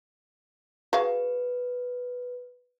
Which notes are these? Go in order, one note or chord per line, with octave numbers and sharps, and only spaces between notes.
F#4 G#4 B4 F5